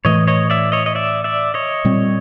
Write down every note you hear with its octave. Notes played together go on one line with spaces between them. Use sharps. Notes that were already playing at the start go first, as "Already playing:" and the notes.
A2 E3 A3 C#5 D#5
C#5 D#5
D5 E5
C#5 D#5
D#5
D5 E5
D5 E5
C#5 D#5
A#2 G3 C4